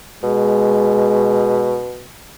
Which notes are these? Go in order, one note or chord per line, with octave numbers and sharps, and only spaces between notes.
B2 G#3